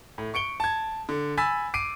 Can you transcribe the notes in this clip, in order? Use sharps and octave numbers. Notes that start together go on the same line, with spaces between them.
A2
C#6 C#7 D7 G7
A5 G#6
D3
G#5 B5 E6 A6 B6
D6 C7 D7 D#7